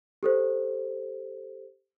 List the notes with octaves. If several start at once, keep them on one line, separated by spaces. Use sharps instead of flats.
G4 A4 C5